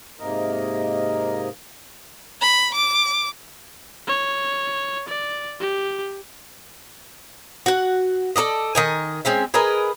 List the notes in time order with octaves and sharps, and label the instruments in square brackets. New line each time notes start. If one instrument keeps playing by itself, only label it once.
[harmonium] G#2 C3 A#3 A#4 D#5
[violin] B5
D6
[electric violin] C#5
D5
G4
[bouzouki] F#4 F#5
A4 A#4 D5 D#5
D#3 D#5 G#5
G#3 C4 C#4 E5
G#4 A#4 B4 D#5